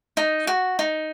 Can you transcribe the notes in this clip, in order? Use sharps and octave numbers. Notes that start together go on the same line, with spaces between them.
D#4
F#4
D#4